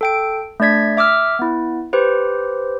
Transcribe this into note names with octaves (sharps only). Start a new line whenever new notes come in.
A4 G5 D7
A3 D4 D5 G#6 B6
E5 D6 E6 F6
B3 E4
G4 B4 C5